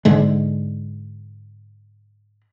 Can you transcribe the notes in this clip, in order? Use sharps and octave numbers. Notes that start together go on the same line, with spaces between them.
G#2 D3 G#3